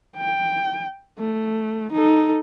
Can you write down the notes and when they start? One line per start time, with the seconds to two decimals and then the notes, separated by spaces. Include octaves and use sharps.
0.17 G5
1.19 A3
1.92 D#4 A4